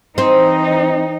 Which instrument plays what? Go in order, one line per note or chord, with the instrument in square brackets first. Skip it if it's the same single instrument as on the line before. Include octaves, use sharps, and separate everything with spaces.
[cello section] E3 D#4 [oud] C4